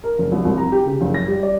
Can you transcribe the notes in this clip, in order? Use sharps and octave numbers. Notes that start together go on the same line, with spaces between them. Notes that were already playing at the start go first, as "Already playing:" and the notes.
A#4
F#1
C2
C2
A#5
G4
C#3
F#1
A#6
G3
D5